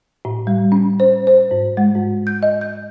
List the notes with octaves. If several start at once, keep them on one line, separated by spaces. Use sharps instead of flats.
A2
G3
C#4
C5
C5
G#2
G#3
G#2
G6
D#5
G6